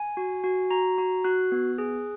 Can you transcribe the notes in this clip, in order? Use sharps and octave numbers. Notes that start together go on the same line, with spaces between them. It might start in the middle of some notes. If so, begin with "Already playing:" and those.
Already playing: G#5
F#4
F#4
F#4 A#5
F#4
F#4 F#6
B3
G#4